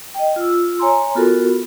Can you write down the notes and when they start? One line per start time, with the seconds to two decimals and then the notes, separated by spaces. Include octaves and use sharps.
0.15 D#5 G5
0.36 F4 E6
0.79 C#5 G#5 A#5 C6
1.15 B3 F4 F#4 A4 A#4